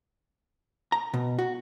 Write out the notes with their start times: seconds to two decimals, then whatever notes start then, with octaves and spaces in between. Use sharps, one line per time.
0.92 A#5
1.14 B2
1.39 F#4